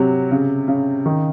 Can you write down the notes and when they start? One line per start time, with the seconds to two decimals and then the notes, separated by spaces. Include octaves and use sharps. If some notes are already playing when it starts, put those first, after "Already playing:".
Already playing: C3 F#3
0.31 C#3
0.68 C#3
1.06 D#3